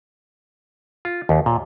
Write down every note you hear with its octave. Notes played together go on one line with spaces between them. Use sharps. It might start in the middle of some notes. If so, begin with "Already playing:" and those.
F4
D#2
A#2